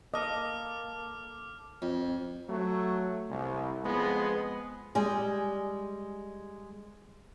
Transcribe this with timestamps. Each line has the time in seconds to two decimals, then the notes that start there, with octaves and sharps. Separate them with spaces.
0.14 A#3 A4 D#5 D6 F6
1.82 F2
2.48 F#3 A3
3.30 C2
3.84 F2 G#3 B3
4.95 G3 G#3 G#4